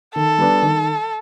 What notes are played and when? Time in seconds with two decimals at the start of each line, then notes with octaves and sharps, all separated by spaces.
0.15 D#3 A4
0.38 G3 B3 D4
0.62 D#3